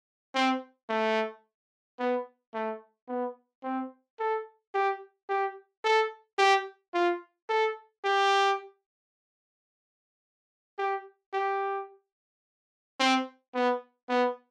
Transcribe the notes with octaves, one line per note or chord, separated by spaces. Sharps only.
C4
A3
B3
A3
B3
C4
A4
G4
G4
A4
G4
F4
A4
G4
G4
G4
C4
B3
B3